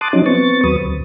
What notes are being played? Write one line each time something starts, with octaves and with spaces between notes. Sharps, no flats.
A5 C6 D6 D#6 F#6 A6
F3 F#3 C#4 D#4
B3 C4 C#6 A6
D#2 F#3 B4 D#6
D2